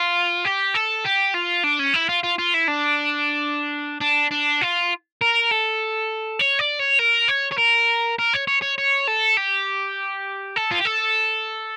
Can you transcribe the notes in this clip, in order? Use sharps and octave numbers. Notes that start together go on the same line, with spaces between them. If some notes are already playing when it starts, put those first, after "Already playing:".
Already playing: F4
G4
A4
G4
F4
D4
C#4
E4
F4
F4
F4
E4
D4
D4
D4
F4
A#4
A4
C#5
D5
C#5
A#4
C#5
C#5
A#4
A#4
C#5
C#5
C#5
C#5
A4
G4
A4
F4
G4
A4